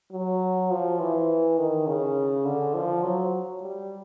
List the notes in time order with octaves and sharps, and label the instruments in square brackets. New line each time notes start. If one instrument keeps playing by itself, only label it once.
[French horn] F#3
F3
E3
D#3
C#3
D3
F3
F#3
G3